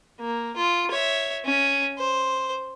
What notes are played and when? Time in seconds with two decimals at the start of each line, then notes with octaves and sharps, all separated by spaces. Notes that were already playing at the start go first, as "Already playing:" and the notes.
0.19 A#3
0.56 F4
0.90 C#5 E5
1.45 C#4
1.99 C5